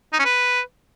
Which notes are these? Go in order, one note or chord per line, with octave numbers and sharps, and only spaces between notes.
D#4
C#4
B4